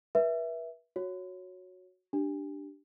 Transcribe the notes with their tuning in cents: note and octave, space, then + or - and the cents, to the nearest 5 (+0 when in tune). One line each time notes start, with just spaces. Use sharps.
B4 -35 E5 +0
F#4 -15 C#5 +0
D4 +0 G4 -5